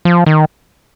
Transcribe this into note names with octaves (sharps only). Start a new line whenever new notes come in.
F3
D#3